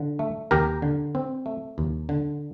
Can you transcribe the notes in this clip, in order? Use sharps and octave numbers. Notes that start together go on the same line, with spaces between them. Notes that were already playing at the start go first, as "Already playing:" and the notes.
Already playing: D3
A3
D#2 G4 A#4
D3
C4
A3
D#2
D3